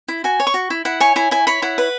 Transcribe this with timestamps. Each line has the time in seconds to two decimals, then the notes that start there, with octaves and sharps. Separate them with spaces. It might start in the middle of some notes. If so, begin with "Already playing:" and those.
0.08 E4
0.24 F#4 G#5
0.40 C#5
0.47 C#6
0.54 F#4
0.70 E4
0.85 E4 F#5
1.00 C#5 G#5
1.16 E4 G#5
1.31 E4 G#5
1.47 C#5 B5
1.62 E4 F#5
1.78 B4